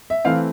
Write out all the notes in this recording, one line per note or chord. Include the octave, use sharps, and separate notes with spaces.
E5
E3 A3 C4 F5